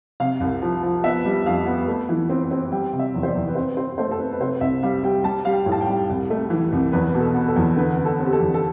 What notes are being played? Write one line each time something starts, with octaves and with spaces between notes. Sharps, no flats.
C3 F5
C2
F3
F3
B3 E5
G3
F2 F5
B3
A3
E3
C4
C4
G3 G5
C3
E5
E2
C5
D5
E2
B4
C4 C5
C4 C5
A3 C5
A4
C4 B4
B4
C3 C5
C2 E5
G3 F5
G3 G5
G3 A5
G3 F5
G5
A2
A5
G5
G3
C2
A3
E3
C2
E2 B4
B2
A4
B3
A4
E2
D3 B4
D3
A4
C4
G4
A4
E2
A4